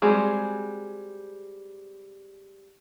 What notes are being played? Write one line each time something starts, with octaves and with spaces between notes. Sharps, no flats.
G3 G#3 C4 F#4 G#4